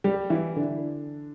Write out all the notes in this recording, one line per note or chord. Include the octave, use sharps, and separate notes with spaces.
G3 G4
E3 E4
D3 D4